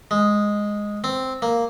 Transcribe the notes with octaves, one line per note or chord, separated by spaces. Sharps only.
G#3
C4
A#3